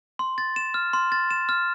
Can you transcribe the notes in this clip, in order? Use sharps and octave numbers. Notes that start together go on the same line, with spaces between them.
C6
A6
E7
F6
C6
A6
E7
F6